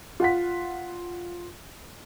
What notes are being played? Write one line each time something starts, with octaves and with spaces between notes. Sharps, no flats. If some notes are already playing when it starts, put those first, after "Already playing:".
F4 F#5 B6